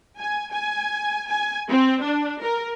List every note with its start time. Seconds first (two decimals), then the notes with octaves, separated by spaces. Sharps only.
0.19 G#5
0.52 G#5
1.28 G#5
1.70 C4
2.02 D4
2.43 A#4